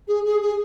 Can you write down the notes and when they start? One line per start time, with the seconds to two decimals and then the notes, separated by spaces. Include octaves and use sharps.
0.08 G#4
0.25 G#4
0.42 G#4